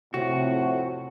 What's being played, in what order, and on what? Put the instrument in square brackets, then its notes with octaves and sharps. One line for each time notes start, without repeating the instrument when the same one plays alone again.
[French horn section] F2 C4 [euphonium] A2 [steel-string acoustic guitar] C3 [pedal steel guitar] F#4